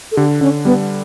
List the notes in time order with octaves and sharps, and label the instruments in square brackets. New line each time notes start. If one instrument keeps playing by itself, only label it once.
[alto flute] A4
[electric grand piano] D3 [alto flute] G4
[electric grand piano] D3 [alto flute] C#4
[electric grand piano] G3 [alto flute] B3